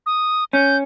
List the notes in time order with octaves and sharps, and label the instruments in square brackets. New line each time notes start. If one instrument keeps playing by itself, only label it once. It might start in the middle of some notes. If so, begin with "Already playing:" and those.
[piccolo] D#6
[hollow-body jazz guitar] C#4 [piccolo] G6